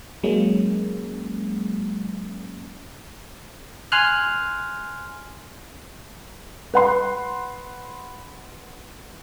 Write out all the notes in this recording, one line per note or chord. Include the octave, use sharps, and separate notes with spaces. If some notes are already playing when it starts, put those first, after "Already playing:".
F#3 G#3 A#3 C#4
G#5 C6 F6 F#6
B4 F#5 C6